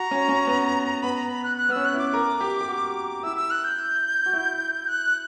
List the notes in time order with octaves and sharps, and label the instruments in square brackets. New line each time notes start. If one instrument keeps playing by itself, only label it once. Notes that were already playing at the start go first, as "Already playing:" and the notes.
Already playing: [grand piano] F#4 [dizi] A#5
[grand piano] C#4
C#4
B3
[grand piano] B3 [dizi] B5
[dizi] A#5
B5
F#6
F#6
[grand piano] B3
[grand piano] C#4 [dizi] E6
[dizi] F#6
[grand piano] E4 [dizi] D6
[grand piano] A#4
G4
G4
F#4
[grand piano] E4 [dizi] E6
[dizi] E6
F#6
G6
[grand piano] F#4
E4
[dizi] F#6